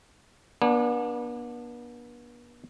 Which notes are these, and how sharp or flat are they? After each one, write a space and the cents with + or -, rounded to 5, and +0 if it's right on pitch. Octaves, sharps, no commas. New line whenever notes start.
B3 -40 D4 +0 G#5 -25